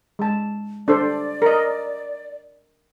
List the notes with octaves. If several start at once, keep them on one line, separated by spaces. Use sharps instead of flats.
G#3 A5
D4 A4 C5 D5
A#4 D#5